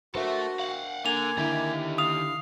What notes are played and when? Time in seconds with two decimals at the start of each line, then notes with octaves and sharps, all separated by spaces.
0.15 D4 F#4 A4 A#4 C5 E5
0.60 F5 F#5
1.06 D3 A#3 G#5 F7
1.38 D3 D#3 E4 G4
1.98 F5 D#6 F7